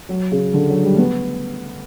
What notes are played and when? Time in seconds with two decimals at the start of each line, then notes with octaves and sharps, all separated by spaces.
0.09 F#3
0.32 C#3
0.54 D3
0.69 F#3
0.84 G3
0.95 A3
0.98 B3